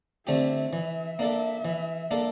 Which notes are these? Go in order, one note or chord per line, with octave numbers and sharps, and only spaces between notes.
D3 A3 C4 G4 E5
E3 E5
A#3 D4 A4
E3
A#3 D4 A4